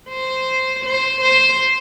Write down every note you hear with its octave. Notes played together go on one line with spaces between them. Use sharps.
C5
C5
C5